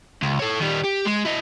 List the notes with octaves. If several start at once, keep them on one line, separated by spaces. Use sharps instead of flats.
C#2
A4 C#5
D#3 G3
G4
G#3
E4 D#5